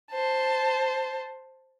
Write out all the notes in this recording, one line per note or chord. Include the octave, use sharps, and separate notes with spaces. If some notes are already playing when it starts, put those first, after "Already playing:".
C5 A5